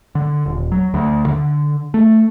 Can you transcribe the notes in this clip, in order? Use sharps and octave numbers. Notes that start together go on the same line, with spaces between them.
D3
D#1
F#3
D2
D3
A3